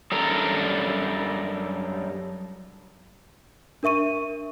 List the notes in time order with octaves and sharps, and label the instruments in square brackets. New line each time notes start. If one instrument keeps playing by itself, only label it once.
[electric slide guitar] F#2 G3 D4 A4 A#4 A#5
[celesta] D4 A#4 E5 C#6 D#7